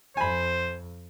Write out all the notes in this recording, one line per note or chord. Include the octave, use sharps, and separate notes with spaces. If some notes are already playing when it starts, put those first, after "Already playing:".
F2 C5 G#5 B5